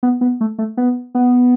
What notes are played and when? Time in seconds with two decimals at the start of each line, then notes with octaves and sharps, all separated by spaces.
0.03 B3
0.21 B3
0.41 A3
0.58 A3
0.77 B3
1.15 B3